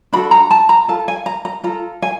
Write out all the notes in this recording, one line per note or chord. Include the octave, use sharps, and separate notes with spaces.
D4 F#4 A4 B5
A#5
A5
A#5
F4 A4 A5
G#5
A#5
A#5
F4 A4 A#5
G#5